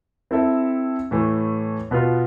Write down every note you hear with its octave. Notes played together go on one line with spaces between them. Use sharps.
C4 E4 A4 E5
A2 E3 A3
B2 B3 F4